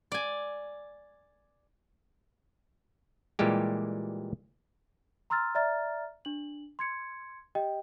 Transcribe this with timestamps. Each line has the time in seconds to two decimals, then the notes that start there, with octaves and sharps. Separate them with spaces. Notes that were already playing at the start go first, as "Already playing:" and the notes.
0.12 D5 G#5
3.39 A#2 E3 G3 G#3 G4
5.30 A#5 C6 E6 F6 A6
5.55 D5 E5 A#5 F6 A6
6.25 D4 F#7
6.79 C6 G#6 C#7
7.55 G4 D#5 G5